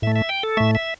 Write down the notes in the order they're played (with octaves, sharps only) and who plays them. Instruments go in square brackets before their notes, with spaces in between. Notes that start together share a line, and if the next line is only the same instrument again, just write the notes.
[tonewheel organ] A2 E5
A3
E5
G5
A4
A2 A3 E5
E5